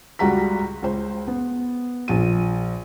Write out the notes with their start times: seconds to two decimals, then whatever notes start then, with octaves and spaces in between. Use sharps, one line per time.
0.19 C#2 G3 F#4 A#5 B6
0.82 C#2 C5
1.27 B3
2.08 A#1 D#7